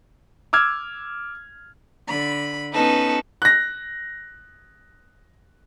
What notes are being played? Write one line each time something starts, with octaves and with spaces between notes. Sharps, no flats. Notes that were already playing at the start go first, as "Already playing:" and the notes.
D6 E6 F6 G#6
D3 B5
B3 C#4 D#4 A4 B4
F#6 A#6